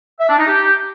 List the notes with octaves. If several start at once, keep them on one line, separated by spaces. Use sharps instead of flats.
E5
D4
D#4
G4